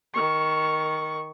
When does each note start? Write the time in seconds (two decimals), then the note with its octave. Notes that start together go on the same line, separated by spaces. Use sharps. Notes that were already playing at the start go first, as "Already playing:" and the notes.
0.14 D#3 C#6